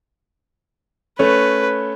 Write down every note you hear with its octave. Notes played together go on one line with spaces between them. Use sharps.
A3 C#4 B4